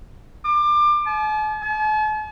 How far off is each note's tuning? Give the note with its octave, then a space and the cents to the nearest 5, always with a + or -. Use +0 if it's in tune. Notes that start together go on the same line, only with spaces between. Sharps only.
D6 +25
A5 -45
A5 -45